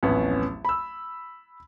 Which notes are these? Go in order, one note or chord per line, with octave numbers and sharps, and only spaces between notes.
D1 A1 F2 B3 C#4
B5 E6